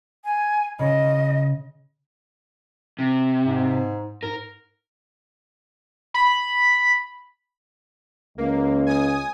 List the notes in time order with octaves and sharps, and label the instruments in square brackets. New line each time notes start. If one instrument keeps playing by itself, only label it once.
[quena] G#5
[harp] C#3 [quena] D#5
[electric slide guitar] C3
[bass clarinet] G#2
[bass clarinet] G#2 [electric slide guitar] A#4
[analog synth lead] B5
[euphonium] C#2 [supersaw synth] A#3
[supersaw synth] G#5 D#6